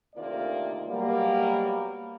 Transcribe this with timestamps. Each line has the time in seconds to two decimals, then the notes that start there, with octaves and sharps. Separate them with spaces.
0.15 D2 C3 D#3 A#3 F4 D5
0.87 B2 F#3 G3 A#3